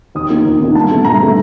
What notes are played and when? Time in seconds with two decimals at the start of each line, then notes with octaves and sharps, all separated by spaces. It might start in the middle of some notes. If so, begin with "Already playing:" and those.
0.15 D#2 D#6
0.30 D#3 A#3 D4
0.45 D#2
0.60 D#3 A#3 D4
0.75 G2 A5
0.91 D3 A3
1.05 G2 A#5
1.20 D3 A3